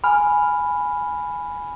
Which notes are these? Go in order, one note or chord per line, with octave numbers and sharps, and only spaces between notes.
G#5 B5 F6